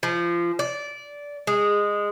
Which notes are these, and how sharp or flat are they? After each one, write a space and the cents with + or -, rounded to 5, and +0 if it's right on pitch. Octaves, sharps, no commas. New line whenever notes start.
F3 -25
D5 -15
G#3 -15